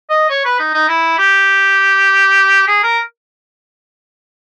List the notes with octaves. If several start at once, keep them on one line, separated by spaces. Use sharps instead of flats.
D#5
C#5
B4
D#4
D#4
E4
G4
G#4
A#4